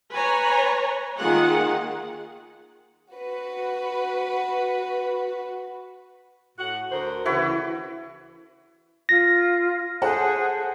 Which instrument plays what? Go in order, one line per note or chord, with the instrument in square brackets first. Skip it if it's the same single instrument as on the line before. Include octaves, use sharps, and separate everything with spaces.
[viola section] B4 C#5 G#5 A#5
D#3 A#3 F4 G#4 F#5
[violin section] F#4 B4
[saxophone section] A2 F#4 F#5
D2 A#4 C5
[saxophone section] D2 C#3 E3 [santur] E4 F#4 B4
[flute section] F4 [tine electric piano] A#6
[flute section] G#4 F#6 [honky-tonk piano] A4 C5 F#5